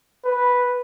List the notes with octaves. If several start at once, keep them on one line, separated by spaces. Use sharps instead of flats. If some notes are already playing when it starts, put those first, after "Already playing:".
B4